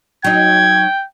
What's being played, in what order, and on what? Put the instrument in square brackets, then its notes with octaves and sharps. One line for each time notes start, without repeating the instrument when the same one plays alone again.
[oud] F#3 D#4 [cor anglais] G5 [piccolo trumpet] G#6